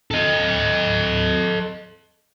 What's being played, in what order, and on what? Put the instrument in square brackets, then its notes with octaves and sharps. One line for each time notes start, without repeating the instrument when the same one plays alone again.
[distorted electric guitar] A4 D#5